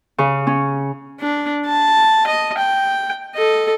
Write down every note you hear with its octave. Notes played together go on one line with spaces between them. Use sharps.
C#3
C#4
D4
A5
D#5
G5
A4 D#5